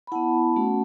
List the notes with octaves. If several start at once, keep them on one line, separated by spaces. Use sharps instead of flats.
B5
B3 E4 F#5 A5
A3 C#4 F#4